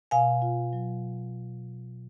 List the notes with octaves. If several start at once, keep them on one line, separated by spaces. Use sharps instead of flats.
B2 F5 G#5
F4
F#3